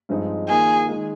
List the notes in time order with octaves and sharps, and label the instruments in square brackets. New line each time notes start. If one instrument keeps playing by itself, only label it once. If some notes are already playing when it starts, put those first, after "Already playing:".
[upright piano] G2 F3 G#3 C4 D#4
[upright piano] D#3 A#3 F4 [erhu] G#4
[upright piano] D#3 G#3